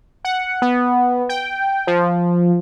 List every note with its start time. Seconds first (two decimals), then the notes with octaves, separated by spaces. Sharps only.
0.25 F#5
0.62 B3
1.29 G5
1.87 F3